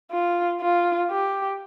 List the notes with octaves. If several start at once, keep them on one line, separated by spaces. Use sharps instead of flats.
F4
F4
G4